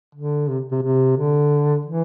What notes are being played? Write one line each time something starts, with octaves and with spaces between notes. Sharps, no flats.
D3
C3
C3
C3
D3
E3